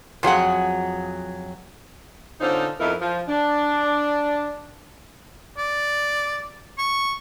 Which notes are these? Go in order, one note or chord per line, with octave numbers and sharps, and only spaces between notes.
F2 F#3 G#4 F#5
D3 C4 C#4 D#4 F4 C5
F2 B3 D#4 E4 A#4 F5
F3
D4
D5
C#6